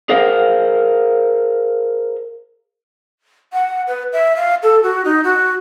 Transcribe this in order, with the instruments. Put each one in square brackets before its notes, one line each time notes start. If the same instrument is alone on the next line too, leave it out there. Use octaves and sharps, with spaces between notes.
[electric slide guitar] G#4 A#4 C5 F5
[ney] F#5
B4
E5
F5
A4
F#4
D#4
F#4